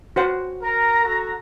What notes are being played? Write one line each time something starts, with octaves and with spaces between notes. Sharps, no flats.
F#4 C5 F#5
A#4 A#5
F#4 A4